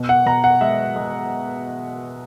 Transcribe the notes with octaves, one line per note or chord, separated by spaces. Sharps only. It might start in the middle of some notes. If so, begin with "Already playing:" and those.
Already playing: B2
F#5
B2 A#5
F#5
G#3 E5
G#3